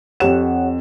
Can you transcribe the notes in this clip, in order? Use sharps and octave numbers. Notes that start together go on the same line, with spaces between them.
F2 G4 C#5 F#5 E7